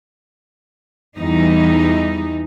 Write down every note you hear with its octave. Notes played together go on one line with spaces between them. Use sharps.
E2 E3 G3 D#4